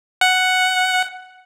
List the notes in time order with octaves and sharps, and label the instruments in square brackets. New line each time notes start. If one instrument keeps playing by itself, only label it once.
[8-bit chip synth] F#5